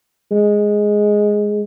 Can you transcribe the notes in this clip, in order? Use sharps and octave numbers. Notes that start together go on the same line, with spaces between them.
G#3